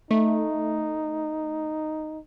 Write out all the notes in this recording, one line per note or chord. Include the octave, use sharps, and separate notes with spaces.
A3 D#4